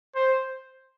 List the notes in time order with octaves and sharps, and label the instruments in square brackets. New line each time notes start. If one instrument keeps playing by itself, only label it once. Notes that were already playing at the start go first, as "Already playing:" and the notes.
[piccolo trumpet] C5